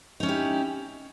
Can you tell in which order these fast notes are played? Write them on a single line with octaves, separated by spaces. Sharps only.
D#4 C#4 E4 G4